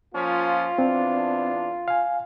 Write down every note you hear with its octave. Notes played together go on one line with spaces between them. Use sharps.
F3 A#3 C#4 F4
E2 C4 D4
F5 G#5